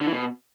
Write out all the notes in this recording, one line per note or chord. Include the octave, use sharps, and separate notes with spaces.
D3
E3
B2